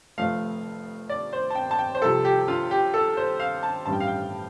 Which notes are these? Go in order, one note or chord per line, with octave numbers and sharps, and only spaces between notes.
F1 F2 F3 A3 F5
D5
C5
A5
G5
A5
G5
C5
C2 C3 F3 A4
G4
F4
G4
A4
C5
F5
A5
A1 G2 G3 A5
G5
F5
G5